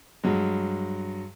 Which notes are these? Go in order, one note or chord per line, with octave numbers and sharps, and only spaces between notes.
G2 F#3 G#3